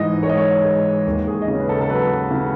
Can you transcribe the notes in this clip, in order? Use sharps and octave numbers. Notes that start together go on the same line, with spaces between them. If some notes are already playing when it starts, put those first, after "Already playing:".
Already playing: G#2 E3 D#5
G#3 C#5
D#5
C#5
G#3
D#2
G#4
D#5
C#3 C#5
B4
A4
A4
F#3 B4
C#3